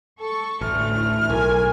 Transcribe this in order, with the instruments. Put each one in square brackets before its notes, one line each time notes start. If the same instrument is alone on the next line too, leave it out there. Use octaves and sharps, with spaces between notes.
[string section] A4 C#6
[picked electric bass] A1 [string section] D2 A3 [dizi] F6
[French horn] E4
[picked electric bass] B1 [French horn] A#4 [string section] G#5